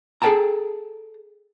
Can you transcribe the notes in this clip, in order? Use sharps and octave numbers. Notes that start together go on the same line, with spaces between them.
G#4 A4 B4 G5 A5 A#5